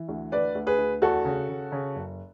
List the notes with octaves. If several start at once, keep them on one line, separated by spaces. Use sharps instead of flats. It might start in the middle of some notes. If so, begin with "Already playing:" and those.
Already playing: E3
D2
D2 B4 D5
D2
G#4 B4
D2
E2 F#4 A4
C#3
C#3
C#3
F#1